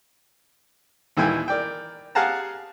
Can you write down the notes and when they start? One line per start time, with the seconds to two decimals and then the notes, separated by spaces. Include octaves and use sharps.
1.17 D#2 A#2 E3 E4 G5 G#5
1.48 A#4 D5 G5
2.15 G4 G#4 F5 F#5 A5 A#5